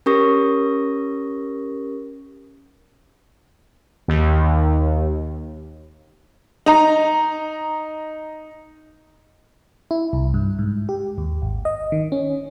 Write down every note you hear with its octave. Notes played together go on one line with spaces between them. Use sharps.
C#4 G4 A#4 C#6 D#6 A#6
D#2
D#4 A#5
E4
C2
G2
G#2
G4
D#2
G#1
D#5
D#3
C#4